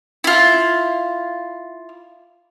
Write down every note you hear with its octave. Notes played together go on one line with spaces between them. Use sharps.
E4 F4